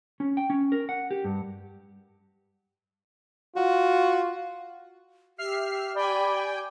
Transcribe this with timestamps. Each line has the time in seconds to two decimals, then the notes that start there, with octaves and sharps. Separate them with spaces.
0.20 C#4
0.37 G5
0.50 C#4
0.72 A#4
0.89 F#5
1.11 G4
1.24 G2
3.56 F4 F#4
5.38 G4 E5 F6 C7
5.96 D5 G5 G#5 B5